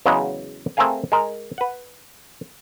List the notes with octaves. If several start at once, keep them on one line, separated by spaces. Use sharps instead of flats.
E2 C#3 F#3 G#3 D#5
A3 C4 G#4 A#4 F5 G#5
G#3 A#4
B4 F#5